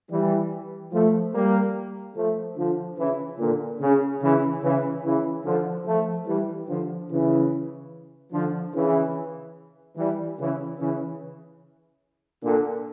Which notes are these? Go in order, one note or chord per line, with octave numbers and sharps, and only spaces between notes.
E3 G3
F3 A3
G3 A#3
F3 A3
D3 F3
C#3 E3
A#2 D3
C#3
C#3 E3
C#3 E3
C#3 E3
D3 F3
F3 A3
E3 G3
D3 F3
C#3 E3
D3 F3
C#3 E3
E3 G3
C#3 E3
C#3 E3
A#2 D3